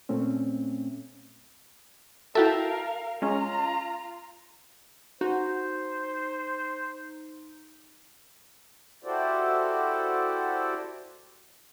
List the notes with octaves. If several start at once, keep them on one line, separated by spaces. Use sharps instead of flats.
A#2 A3 C4 C#4
E4 F#4 A4 A#4 E5 F5 G5 A5
G#3 C#4 F4 A#5
D#4 F#4 C5
E4 F#4 G4 A4 C5 D5